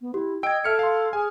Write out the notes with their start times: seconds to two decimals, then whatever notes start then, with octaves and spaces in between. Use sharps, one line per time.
0.01 B3
0.14 E4 G4
0.43 D#5 G5 E6 G#6 D7
0.64 A4 E5 F6 C#7
0.79 F5 C6
1.13 G#4 G#5